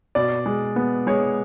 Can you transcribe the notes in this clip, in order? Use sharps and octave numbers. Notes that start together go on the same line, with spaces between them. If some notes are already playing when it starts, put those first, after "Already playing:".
B2 D5
G#3
B3
G#3 C#5